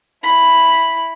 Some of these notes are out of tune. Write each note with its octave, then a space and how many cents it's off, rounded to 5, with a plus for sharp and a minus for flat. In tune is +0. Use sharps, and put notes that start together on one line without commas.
E4 +0 B5 +0